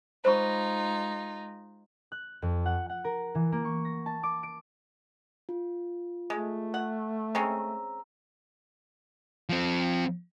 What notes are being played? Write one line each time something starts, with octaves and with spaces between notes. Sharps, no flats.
G#3 D#4 F4 C5 B5 C#6
F#6
F2
F#5
F#5
A#4
E3
A#3
C#6
A#6
A5
D6
D7
F4
G#3 A3
F#5
G#3 C4 C#4 A#5 E6
F3 C4